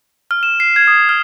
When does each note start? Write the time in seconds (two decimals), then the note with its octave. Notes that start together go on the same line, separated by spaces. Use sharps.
0.31 F6
0.43 E7
0.60 C7
0.76 G#6
0.87 D#6
1.09 F6